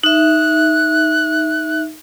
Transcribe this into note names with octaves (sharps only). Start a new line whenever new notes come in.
D#4 E5 F#6